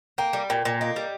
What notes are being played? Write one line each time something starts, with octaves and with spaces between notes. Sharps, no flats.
A#3 G5
G3
A#2 G5
A#2
A#3 D#5
G3